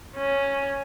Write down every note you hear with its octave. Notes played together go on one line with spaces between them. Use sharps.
C#4